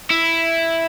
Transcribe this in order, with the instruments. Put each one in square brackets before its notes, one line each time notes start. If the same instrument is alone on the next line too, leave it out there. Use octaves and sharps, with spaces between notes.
[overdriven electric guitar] E4